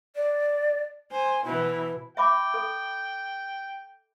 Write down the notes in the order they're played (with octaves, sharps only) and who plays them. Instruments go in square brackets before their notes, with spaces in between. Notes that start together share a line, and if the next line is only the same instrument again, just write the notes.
[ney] D5
[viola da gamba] C5 [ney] G#5
[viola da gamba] B2 E3 [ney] E4
[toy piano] E5 B5 D6 [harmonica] G5
[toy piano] A4